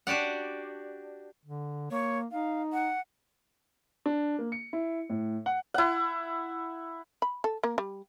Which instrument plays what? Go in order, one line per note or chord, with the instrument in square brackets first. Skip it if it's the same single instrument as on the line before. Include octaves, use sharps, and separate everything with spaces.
[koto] D4 F#4 G4 D5 F#5
[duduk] D3
[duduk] A#3 [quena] C#5
[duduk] D#4 [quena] F5
[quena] F#5
[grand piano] D4
A#3
C#7
E4
A2
F#5
[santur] E4 F#5
[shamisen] B5
A4
A#3
G3